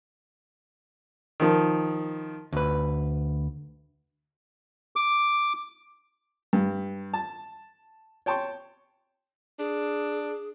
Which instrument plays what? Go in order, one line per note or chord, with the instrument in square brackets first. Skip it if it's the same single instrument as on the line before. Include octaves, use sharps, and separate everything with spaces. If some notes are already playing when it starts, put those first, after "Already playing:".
[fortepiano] D#3 F3
[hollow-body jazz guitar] D2 B4
[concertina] D6
[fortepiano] G2
A5
C#5 G5 A5 C6 C#6
[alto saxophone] D4 [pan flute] G#4